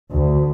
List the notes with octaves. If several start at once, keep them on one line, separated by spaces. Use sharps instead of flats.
D2